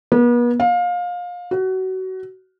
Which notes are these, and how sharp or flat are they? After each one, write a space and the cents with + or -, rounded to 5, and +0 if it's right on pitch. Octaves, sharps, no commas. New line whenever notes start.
B3 -40
F5 +25
F#4 +25